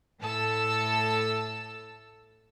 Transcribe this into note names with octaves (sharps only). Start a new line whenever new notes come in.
A2 A4 A5 E6